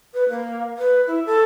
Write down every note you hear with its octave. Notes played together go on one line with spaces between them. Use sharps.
B4
A#3
B4
E4
A4